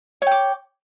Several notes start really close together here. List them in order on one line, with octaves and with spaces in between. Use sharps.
C#5 G5 D6